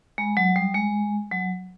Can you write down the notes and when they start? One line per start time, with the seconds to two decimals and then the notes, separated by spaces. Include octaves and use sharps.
0.18 G#3
0.37 F#3
0.56 G3
0.75 G#3
1.32 F#3